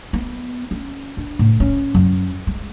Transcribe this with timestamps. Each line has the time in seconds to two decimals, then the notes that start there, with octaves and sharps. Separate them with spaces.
0.13 B3
0.71 C#4
1.17 D4
1.39 A2
1.60 C#4
1.95 F#2
2.47 G#3